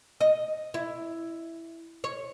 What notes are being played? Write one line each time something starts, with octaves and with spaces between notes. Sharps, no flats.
D#5
E4
C#5